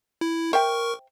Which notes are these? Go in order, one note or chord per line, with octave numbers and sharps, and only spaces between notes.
E4
A#4 C5 E5 G5 C#6